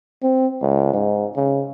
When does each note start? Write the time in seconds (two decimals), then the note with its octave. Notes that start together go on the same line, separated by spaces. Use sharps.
0.22 C4
0.62 C#2
0.93 G#2
1.36 C#3